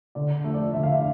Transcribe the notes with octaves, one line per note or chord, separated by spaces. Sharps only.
D3 D5
F3 A3
D5
D3 E5
F5
E5